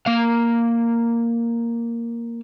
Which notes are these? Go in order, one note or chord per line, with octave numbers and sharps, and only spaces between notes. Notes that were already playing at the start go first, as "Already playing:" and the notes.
A#3 F5